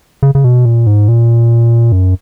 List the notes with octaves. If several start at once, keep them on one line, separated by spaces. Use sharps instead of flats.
C#3
C#3
B2
A#2
G#2
A#2
F#2